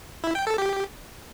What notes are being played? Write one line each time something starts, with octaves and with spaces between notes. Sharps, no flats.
E4
G5
A4
G4